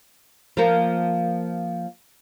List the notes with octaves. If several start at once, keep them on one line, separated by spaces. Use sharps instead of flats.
F3 A#3